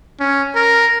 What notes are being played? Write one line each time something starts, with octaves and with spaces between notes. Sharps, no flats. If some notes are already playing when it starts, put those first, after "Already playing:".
C#4
A#4